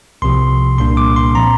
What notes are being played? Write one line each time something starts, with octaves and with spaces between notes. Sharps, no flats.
C2 C3 F3 C6
C2 A#2 A#3 D4 C6
D6
C6
A#2 F3 C4 A#5